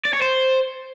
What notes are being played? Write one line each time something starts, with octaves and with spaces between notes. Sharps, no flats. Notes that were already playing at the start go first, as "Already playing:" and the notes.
D5
C#5
C5